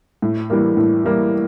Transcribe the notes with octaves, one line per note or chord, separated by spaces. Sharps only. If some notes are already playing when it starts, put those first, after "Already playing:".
A2
E3 G3 A#3
A2
E3 G3 A#3